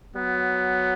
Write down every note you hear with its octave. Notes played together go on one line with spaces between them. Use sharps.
F#3 B3